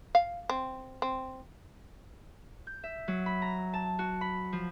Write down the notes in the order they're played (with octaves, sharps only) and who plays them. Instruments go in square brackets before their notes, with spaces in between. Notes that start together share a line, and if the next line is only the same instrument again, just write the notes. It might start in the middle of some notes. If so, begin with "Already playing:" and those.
[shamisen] F5
C4
C4
[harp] G6
E5
F#3
B5
A#5
A5
F#4
B5
F3